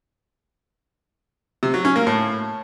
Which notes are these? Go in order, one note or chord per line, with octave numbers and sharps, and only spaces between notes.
C3
F#3
C#4
A#3
A2